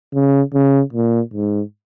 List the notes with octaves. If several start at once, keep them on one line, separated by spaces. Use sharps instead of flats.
C#3
C#3
A#2
G#2